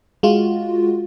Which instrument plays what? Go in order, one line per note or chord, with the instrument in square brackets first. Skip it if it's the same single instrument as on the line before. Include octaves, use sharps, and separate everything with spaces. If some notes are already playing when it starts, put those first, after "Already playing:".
[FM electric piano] G#3 F4 F#4